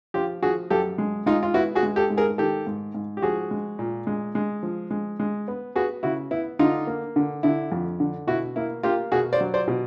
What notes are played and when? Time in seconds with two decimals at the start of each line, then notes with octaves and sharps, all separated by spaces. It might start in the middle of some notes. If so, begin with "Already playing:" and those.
0.14 F3 F4 G4
0.43 F3 F#4 G#4
0.70 F#2 G4 A4
0.98 G#3
1.26 G#3 D#4 F4
1.43 F4
1.54 B3 E4 F#4
1.75 F#4 G#4
1.83 G#3
1.96 G4 A4
2.10 G#2
2.17 G#4 A#4
2.38 D#3 G4 A4
2.67 G#2
2.94 G#2
3.17 G4
3.22 F3 F#4 G#4
3.51 G#3
3.79 A#2
4.07 G#3
4.35 G#3
4.63 F3
4.91 G#3
5.20 G#3
5.48 B3
5.76 B3 F#4 G#4
6.03 C#3 E4 F#4
6.31 B3 E4
6.59 D3 D#4 F4
6.87 A#3
7.16 D3
7.43 D3 E4
7.72 F2
8.00 D3
8.27 B2 E4 F#4
8.56 A#3 E4
8.83 A#3 F4 G4
9.12 B2 F#4 G#4
9.33 C5 D5
9.41 F#3
9.54 C5 D5
9.68 B2